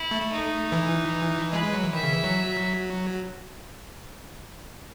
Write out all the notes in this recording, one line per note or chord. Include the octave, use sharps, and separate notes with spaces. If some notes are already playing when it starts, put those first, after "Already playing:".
Already playing: E4
A3
A3
D#4
E3
G#3 B4
G#3
F#3
E3
D#3 E5
C#3
E3
F#3